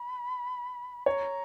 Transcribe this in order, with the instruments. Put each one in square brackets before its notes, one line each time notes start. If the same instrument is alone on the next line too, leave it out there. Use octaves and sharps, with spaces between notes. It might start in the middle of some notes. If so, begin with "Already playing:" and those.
Already playing: [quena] B5
[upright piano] C#5 [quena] A#5